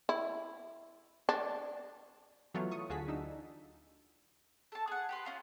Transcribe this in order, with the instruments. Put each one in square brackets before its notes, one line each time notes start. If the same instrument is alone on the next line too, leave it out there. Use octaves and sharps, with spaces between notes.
[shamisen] E4
D4
[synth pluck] E3 F#3 A3 B3 F4 C#5
C#6 D#6
D2 F4 F#4 G#4 A5 B6
D4 D#4 E6
[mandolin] A4 A5
G#4 F#5
G4 B4 C6
C#4 F4 C6